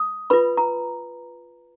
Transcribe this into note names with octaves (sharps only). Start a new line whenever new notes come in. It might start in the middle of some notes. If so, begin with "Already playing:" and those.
Already playing: D#6
F4 B4 B5
A#5